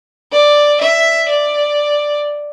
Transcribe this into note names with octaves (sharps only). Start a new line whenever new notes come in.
D5
E5
D5